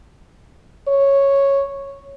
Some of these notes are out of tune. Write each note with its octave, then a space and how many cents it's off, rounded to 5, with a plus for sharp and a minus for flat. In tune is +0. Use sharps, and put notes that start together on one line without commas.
C#5 -5